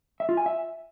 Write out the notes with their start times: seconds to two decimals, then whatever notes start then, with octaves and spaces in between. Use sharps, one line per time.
0.20 E5
0.29 F4
0.37 G#5
0.46 E5